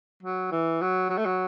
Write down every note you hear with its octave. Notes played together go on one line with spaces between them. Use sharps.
F#3
E3
F#3
F#3
A3
F#3